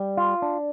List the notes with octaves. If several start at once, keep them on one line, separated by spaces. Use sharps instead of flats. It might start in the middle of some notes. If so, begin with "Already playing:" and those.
Already playing: G3
F4
D4